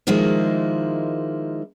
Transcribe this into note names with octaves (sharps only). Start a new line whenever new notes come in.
D#3 F3 G#3 A#3 D#4 E4